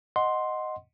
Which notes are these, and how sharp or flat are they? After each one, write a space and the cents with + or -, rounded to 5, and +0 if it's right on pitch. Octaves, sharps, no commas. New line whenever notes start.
D#5 +0 F#5 +0 C6 +0